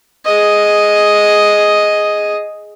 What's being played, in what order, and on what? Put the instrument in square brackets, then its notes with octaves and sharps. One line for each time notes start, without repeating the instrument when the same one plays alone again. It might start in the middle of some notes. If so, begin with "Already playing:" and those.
[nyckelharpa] G#4 D#5